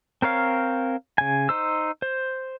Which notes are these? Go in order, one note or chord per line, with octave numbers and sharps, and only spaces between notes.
C4 A#4 C#5 F5
C#3 G#5
D#4 C5 E6
C5